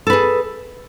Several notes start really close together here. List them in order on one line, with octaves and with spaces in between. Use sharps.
A4 B4 G#4